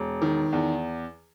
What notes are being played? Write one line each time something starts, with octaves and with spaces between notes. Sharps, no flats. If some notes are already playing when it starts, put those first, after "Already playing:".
Already playing: E1
D#3
E2